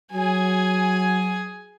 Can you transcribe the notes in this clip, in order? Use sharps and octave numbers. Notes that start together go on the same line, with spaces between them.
F#3 G#4 G#5